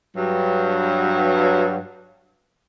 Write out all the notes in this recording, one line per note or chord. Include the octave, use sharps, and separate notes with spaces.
G2 F#3